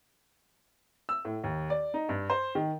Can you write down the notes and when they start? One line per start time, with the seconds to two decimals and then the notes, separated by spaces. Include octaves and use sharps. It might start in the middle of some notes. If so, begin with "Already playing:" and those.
1.09 E6
1.25 A2
1.44 D#2
1.70 D5
1.94 D#4
2.09 G2
2.30 C5
2.55 D#3